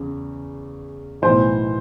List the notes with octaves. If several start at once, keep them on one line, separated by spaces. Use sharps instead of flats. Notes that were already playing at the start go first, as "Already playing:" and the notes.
Already playing: E2 C#3
B1 A2 E3 C5